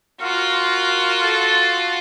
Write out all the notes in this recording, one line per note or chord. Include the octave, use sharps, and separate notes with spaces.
F4 F#4 A#4
A4